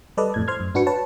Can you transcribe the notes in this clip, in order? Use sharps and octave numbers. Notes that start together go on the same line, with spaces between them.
G3 A4 B4 D5 D#5
F2 A2 G#6
C5 C6 F6 G#6
F#2
G#2 D4 F#4 B4 C#7
B4 C#5 A5